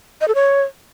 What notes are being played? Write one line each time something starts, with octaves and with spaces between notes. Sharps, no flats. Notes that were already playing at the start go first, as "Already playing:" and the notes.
D#5
A4
C#5